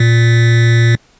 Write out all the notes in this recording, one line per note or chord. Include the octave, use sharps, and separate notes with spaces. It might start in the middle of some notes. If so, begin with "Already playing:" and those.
Already playing: A#2